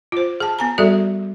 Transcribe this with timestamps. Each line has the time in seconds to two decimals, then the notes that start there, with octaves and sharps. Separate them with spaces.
0.12 F4 C5
0.40 G#4 A5
0.59 B3 G#5 A#5
0.78 G3 F#4 G#4 A4 D5 E5